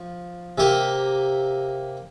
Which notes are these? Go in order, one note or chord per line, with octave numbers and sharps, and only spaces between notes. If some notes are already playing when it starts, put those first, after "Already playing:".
Already playing: F3
C3 A#3 G4